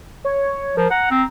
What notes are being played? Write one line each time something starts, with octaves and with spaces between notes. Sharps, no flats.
C#5
F3 A#4
F#5 A#5
C4